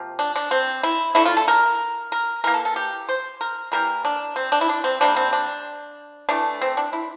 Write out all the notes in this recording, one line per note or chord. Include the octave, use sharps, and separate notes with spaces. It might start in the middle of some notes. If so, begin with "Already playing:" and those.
Already playing: C3 F3 A#3
D4
D4
C4
E4
D3 A3 E4
F4
A4
A#4
A#4
E3 A#3 A#4
A4
A4
G4
C5
A#4
E3 G3 A#3 A#4
D4
C4
D4
E4
D4
C4
C3 G3 A#3 D4
C4
D4
E3 A3 D4
C4
D4
E4